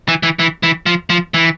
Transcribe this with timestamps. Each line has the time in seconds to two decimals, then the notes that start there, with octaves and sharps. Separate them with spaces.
0.08 E3
0.23 E3
0.39 E3
0.63 E3
0.86 F3
1.10 F3
1.34 E3